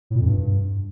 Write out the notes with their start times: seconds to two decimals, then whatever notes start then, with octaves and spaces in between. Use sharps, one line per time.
0.10 A2
0.16 A#2
0.21 F2
0.26 G2